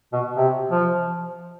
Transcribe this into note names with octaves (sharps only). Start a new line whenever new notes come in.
B2
C3
F3